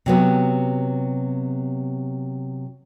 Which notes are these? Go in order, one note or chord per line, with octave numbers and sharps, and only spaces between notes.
C3 F#3 B3